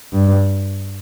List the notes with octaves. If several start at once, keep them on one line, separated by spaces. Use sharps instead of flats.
G2